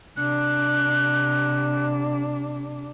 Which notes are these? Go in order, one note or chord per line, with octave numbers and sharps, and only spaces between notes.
C3 D4 F#6